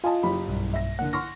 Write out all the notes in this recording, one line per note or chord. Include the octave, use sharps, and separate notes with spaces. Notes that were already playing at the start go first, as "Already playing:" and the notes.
F4 D#5 G#5 A5
F#1 G4 B5
B1 G2
E5 A#6
D3 A#3 F#5
C6 C#6 F6 A#6